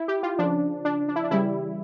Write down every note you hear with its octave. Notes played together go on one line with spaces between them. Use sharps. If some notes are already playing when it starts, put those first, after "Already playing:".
Already playing: E4
G4
F4
C#3 F3 D4
D4
D4
E4
D4
C#3 E3 G3 E4